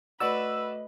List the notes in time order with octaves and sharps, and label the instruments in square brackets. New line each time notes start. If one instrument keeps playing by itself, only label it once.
[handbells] A3 D#5 B5 [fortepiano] F#4 D5 F#5 [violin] B4 [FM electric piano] E6